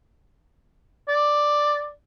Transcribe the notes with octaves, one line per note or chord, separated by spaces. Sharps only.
D5